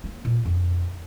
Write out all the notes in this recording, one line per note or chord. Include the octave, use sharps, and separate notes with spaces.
A#3
A#2
F2